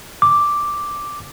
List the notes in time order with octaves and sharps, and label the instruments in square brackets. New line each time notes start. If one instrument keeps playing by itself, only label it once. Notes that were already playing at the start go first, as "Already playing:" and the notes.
[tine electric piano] D6